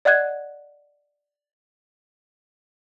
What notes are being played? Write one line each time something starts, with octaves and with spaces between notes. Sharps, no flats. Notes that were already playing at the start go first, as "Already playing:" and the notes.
D5 D#5 F#5 F#6 G#6